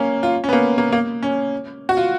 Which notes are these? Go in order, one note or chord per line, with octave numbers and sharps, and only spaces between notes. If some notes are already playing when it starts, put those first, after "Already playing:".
Already playing: A#3 C#4
F4
C#4
B3
A#3
A#3
A#3
C#4
F#4
F4